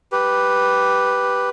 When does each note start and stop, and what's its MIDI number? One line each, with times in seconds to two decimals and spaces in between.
0.12 1.50 67
0.12 1.50 71